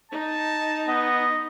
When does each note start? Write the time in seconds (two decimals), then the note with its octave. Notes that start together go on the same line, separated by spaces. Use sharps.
0.12 D#4 A5
0.88 B3 D#5